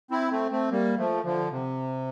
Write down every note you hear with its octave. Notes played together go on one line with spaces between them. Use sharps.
C4 E4
A3 C4
A3 C4
G3 A#3
F3 A3
D3 F3
C3